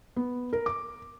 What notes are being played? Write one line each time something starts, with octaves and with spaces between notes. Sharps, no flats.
B3
A#4
D6